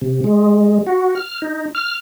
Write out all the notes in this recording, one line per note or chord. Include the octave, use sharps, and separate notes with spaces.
C3
G#3
F#4
F6
D#4
F6